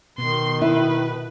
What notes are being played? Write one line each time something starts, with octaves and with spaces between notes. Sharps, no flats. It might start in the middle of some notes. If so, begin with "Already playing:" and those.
B2 D#3 C6
E4 B4